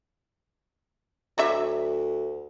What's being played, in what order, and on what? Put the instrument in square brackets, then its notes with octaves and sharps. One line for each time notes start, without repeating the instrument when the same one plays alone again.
[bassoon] D2 [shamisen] F#3 D4 E5